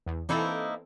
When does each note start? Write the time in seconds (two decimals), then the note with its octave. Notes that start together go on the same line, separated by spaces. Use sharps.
0.06 E2
0.29 E3 A#3 C4 D#4 E4 A4